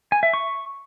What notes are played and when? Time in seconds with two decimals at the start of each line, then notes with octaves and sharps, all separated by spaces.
0.12 G#5
0.23 E5
0.34 C#6